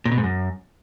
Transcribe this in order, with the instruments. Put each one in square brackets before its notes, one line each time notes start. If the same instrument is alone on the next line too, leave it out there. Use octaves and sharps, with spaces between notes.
[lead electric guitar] A#2
B2
G#2
F#2